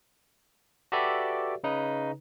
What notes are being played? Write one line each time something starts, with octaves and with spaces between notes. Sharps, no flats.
F#4 G4 A4 B4 D5 E5
C#3 D#4 B4